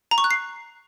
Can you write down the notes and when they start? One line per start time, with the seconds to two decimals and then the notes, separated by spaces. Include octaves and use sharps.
0.11 A#5
0.18 C#6
0.24 F#6
0.31 C7